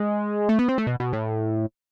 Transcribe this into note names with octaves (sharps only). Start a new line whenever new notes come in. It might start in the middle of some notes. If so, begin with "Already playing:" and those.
Already playing: G#3
A3
B3
C4
A3
B2
B2
A2